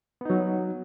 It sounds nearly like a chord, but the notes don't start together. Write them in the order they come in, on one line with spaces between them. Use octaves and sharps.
B3 D#4 F#3